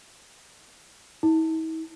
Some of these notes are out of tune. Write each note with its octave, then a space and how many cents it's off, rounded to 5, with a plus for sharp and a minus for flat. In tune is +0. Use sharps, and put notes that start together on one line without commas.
E4 -45